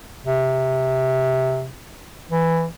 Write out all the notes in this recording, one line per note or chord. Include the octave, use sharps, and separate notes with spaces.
C3
E3